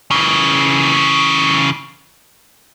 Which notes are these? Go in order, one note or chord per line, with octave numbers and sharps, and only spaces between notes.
C#3 E3